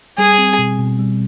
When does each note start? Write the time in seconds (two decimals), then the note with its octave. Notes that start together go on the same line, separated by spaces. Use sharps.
0.18 G3 G#4
0.38 C4
0.59 B2
0.79 B2
0.99 G3